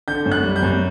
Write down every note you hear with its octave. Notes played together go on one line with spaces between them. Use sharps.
D3 G6
F#2
F#6
G3
G6
F#2